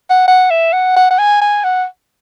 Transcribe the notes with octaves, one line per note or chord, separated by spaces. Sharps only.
F#5
F#5
E5
F#5
F#5
F#5
G#5
G#5
F#5